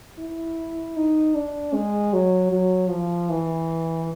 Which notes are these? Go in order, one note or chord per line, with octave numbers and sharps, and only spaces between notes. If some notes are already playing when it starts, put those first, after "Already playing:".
E4
D#4
D4
G#3
F#3
F#3
F3
E3